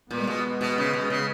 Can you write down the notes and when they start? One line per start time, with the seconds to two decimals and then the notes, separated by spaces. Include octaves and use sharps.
0.11 A#2 G#3 B3
0.27 B2
0.61 B2
0.78 C#3
0.93 B2
1.10 C#3